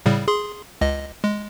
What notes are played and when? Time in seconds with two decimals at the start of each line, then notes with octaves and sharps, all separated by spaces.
0.06 A2 C#3 G3
0.28 G#4 C6
0.81 C#2 D#5
1.24 G#3